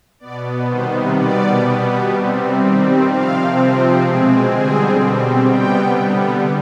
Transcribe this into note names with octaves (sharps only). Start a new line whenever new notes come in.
B2 B3 D5
C3 D#3 G3 B3 C5
B2 G3 B3 D5
B2 G3 B3
C3 G3 C4
D#3 G3 C4
C3 F3 C4 F5
C3 F3 C4
B2 G#3 C4 G#4
D3 G3 C4 G#4
B2 G3 C4
C3 G3 B3 G5
D3 G3 B3